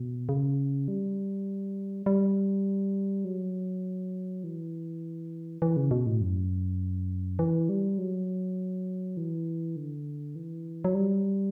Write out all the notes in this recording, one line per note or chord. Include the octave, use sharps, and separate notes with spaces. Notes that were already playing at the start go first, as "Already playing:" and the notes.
Already playing: B2
C#3
G3
G3
F#3
E3
E3
C#3
B2
A2
F#2
E3
G3
F#3
E3
D3
E3
F#3
G3